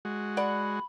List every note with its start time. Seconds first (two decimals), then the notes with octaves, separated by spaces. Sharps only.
0.05 G#3 F#4
0.37 D5 F#5 B5